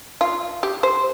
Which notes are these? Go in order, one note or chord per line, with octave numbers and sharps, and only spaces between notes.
F4
G4
C5